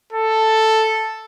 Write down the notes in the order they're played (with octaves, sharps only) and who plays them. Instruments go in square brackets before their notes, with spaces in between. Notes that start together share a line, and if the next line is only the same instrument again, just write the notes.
[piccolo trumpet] A4